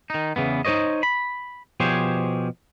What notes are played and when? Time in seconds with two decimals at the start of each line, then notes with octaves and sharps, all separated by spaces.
0.10 D#3 D#4
0.36 E2 C#3 E3 B3
0.65 D#4 G4 C5 C#5 D#5
1.03 B5
1.80 B2 F3 G4 G#4 C5 C#5